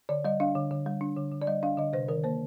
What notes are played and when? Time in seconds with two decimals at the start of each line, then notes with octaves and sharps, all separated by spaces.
0.09 D3 D5
0.25 G3 D#5
0.40 D4 F5
0.55 D3
0.71 D3
0.86 G3
1.01 D4
1.17 D3
1.32 D3
1.42 D5
1.47 G3 D#5
1.63 D4 F5
1.78 D3 D#5
1.93 C3 C5
2.08 D#3 A#4
2.24 A#3 C5